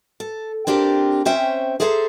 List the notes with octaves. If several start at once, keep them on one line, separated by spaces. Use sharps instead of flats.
A4
C4 D4 F4 G4 A#4
C4 C#4 C5 C#5 E5 G5
G#4 A4 C5 E5 G#5 A#5